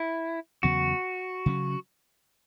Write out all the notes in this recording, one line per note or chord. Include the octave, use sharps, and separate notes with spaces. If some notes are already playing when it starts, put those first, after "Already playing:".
Already playing: E4
E2 C#3 F#3 B3 F#4
C#3 F#3 C#4